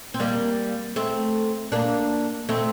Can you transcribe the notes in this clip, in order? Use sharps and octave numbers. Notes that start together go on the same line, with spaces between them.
C4
G3 A#3
A3 C4
A#3 D4
A3 C4